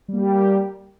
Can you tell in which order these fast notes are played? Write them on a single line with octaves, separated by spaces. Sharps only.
G3 A#3 G4